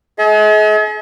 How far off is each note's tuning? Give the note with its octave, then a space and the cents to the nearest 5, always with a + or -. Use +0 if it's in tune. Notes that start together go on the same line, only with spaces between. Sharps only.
G#4 +40 D#5 +45